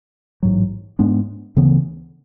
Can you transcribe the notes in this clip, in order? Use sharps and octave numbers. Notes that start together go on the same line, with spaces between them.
A1 G#2 F#3
G#2 G#3 B3 D4
D2 C#3 E3 B3